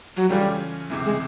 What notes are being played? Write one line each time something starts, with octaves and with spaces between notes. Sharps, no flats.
F#3
C#3 E3 G3 A3 C#4 F4
C#2 C3 E3
G#3